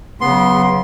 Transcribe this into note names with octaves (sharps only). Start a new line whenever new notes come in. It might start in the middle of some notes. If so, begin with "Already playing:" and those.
C#3 F#3 B3 C6